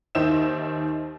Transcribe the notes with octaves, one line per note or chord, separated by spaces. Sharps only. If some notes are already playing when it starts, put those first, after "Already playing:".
D#2 D#3 C5 D#5 E5 E7